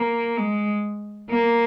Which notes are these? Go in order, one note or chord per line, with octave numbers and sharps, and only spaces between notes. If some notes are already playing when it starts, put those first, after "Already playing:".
Already playing: A#3
G#3
A#3